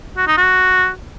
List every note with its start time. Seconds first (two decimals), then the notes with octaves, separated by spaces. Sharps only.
0.17 F#4
0.27 D#4
0.37 F#4